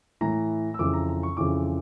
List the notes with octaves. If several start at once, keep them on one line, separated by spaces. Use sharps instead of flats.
A2 E3 A#5
E6
F2 C#3 E3 D6
A#5
A#5
C#6
F2 C#3 E3 D6